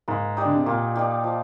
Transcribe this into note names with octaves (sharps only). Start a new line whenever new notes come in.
G#2 A#3
D#4 G4 D5
D3
C3
A#2 A#3
D#4 G4 D5
F3